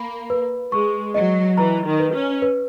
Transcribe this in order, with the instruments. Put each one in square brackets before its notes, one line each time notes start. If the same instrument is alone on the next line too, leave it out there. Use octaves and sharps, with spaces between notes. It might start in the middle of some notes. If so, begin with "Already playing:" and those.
Already playing: [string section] A#3 [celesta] B5
[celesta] B4
[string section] G#3 [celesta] C#6
[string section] F#3 [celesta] D#5
[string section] E3 [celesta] A#5
[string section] D#3
[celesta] B4
[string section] C#4
[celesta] B4